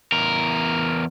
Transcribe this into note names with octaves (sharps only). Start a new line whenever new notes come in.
E2 A#4